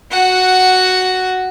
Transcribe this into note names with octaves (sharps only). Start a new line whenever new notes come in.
F#4 F#5